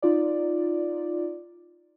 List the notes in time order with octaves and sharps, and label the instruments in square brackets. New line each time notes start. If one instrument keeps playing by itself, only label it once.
[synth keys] D#4 F4 D5